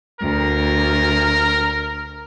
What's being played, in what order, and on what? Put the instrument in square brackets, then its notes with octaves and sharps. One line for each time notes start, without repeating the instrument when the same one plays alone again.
[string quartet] D2 [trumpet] A#4